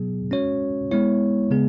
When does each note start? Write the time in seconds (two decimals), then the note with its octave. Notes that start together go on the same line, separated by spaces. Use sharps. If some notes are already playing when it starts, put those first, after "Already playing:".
Already playing: B2 F#3 B3 G#4
0.31 G#3 C#4 F#4 C#5
0.91 G#3 B3 E4 C#5
1.51 C#3 G#3 B3 G#4